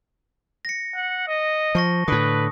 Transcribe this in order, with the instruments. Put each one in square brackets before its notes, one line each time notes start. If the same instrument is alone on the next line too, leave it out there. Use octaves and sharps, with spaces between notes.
[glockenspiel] A#6 C#7
[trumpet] F#5
D#5
[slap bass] F3 [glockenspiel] A5 C#6 A#6
[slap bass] A2 D3 [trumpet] B4 [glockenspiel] D#6